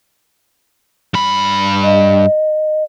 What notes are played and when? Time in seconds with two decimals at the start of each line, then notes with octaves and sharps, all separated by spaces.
1.14 G2 B5
1.83 D#5